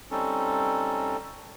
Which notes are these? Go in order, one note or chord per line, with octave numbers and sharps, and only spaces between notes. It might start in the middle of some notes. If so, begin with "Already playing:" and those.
G3 C4 C#4 D#4 A4